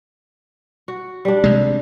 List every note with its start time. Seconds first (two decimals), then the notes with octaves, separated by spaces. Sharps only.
0.88 F#4
1.25 G3 D4
1.44 C3 G#3